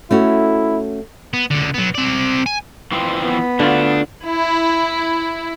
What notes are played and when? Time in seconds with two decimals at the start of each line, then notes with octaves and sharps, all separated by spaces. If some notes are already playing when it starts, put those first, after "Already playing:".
0.11 A3 C#4 E4 F#4
1.34 B3
1.51 C#2 D3
1.74 F#3 B3
1.95 C4 D5
2.46 G#5
2.92 E3 F3 C4
3.24 B3
3.59 D3 A3 D4 F4
4.23 E4